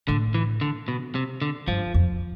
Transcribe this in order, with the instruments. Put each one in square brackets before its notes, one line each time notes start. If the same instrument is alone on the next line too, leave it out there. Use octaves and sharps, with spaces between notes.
[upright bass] A2 [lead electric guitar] D3
[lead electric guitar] E3
D3
B2
C3
D3
[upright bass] G2 [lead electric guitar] F3
[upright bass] F2